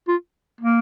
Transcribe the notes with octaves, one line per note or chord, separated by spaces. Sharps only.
F4
A#3